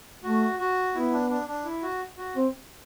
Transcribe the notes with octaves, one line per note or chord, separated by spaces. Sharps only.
A3 F#4
F#4
B3 E4
D4
D4
D4
E4
F#4
F#4
C4